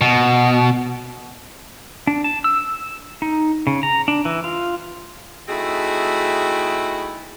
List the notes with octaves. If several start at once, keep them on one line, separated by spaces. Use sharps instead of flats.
B2
D4
A5
E6
D#4
C#3
A#5
D4
E3
F4
A3 C4 D#4 E4 F#4 G#4